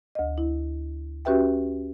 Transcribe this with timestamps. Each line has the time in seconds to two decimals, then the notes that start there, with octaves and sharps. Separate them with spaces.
0.15 D2 D#5
0.38 E4
1.25 C#4 F#4 G4 B4 E5 G5